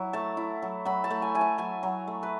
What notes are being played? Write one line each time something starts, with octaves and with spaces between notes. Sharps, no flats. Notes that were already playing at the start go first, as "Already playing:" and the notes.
Already playing: F#3 E4
A3 A5
E4
F#3
F#3 B5
A5
A3
G#5
E4 G#5
A5
F#3 G#5
F#3
A3
B4